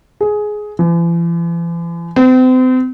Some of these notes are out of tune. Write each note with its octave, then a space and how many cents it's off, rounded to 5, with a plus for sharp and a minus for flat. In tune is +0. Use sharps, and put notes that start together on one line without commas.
G#4 +15
E3 +45
C4 -35